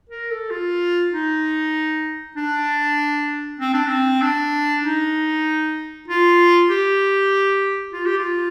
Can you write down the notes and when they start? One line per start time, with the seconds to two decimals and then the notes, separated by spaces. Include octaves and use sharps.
0.10 A#4
0.30 A4
0.50 F4
1.13 D#4
2.36 D4
3.59 C4
3.73 D4
3.87 C4
4.22 D4
4.83 D#4
6.08 F4
6.69 G4
7.93 F4
8.05 G4
8.18 F4